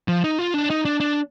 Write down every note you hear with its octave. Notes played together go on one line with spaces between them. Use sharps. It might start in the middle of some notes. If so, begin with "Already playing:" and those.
F3
D#4
F4
D4
D#4
D4
D4